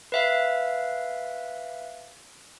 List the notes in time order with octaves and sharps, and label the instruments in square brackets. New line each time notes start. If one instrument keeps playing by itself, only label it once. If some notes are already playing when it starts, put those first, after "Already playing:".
[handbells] B4 E5 F5